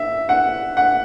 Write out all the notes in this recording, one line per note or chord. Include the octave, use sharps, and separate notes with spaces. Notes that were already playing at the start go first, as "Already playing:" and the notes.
Already playing: E5
F#5
F#5